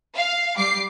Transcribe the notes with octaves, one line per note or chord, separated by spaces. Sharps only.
F5
G3 D6 C7